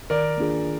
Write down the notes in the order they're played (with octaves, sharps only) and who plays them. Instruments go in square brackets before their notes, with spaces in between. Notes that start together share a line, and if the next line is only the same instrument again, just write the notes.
[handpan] D#3 [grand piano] A#4 D5
[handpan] A#3 D4 F4 G#4